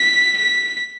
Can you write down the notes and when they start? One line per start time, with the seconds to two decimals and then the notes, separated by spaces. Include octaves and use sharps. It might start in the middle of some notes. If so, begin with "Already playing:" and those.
Already playing: B6
0.37 B6